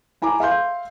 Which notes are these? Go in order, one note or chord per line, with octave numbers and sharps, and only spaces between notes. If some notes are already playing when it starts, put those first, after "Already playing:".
E4 G#5 A#5 D6
E5 F5 C6 G6